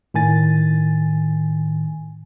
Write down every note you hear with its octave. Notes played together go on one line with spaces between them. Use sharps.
A2 D#3 G#5 A6